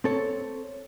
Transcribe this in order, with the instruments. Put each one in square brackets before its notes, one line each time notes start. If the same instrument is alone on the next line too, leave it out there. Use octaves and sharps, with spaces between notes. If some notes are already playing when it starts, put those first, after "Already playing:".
[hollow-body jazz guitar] C4 A4 C#5